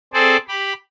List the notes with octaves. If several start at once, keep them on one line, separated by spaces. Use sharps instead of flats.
C4 G#4 A4 C5 D5
G4 B5